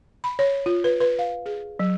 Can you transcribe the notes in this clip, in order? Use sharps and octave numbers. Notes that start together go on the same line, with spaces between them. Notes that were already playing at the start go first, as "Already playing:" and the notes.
B5
C#5
F4
B4
B4
F5
G#4
F#3